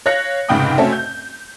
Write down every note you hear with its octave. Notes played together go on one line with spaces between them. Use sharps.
C#5 F5 F#6 A#6 C#7
F1 G#2 C#3 G5 B5 D#6
A3 C4 C#4 F#4 A4 E5
G6